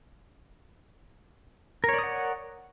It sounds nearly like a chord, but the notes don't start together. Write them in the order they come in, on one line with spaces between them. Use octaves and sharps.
A#4 C#5 D5 D#6 F#5